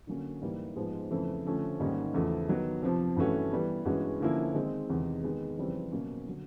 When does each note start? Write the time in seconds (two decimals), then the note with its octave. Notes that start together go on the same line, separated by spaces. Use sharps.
0.07 D3 F#3 A#3 C#4
0.41 G#2 E3 G3 A#3
0.75 G#2 F3 G#3 B3
1.11 F2 C#3 E3 A3
1.45 D3 F3 A3 C#4
1.80 G#2 D#3 G3 A#3 C#4
2.14 E2 C#3 F3 A3
2.48 D#3 F#3 B3
2.82 F2 C3 F3
3.16 G2 E3 A3 C#4 F#4
3.52 E3 G3 B3
3.85 G2 E3 G#3 C#4 F#4
4.20 D3 F3 A#3 C#4 E4
4.54 D#3 G#3 C4
4.89 E2 C3 D#3 G#3
5.23 D#3 G#3 B3
5.57 F2 C#3 E3 G3 C4
5.92 B2 F#3 A#3 C#4
6.27 D3 F#3